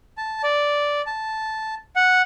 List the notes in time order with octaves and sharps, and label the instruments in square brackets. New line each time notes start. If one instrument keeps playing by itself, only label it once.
[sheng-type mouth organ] A5
D5
A5
F#5